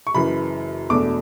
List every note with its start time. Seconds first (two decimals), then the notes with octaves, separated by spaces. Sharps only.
0.07 C#6
0.14 F#1 F#2 E3 B5
0.89 E1 E2 B2 A3 D4 D6